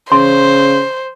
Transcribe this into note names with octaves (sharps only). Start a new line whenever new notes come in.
C#3 C5 C6